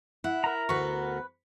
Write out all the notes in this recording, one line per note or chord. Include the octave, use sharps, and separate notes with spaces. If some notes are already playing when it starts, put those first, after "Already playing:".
E4 F#5
A#4 A#5
D2 B3 F#4 B4 C#6